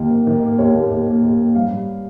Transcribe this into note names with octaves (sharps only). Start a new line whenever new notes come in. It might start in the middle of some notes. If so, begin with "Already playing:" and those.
Already playing: D#2 D#3 A#3
D#3
D#3
A#3
D#2 C#5
D#2
D#2
A#3
D#2
A#3
G2 F5
G2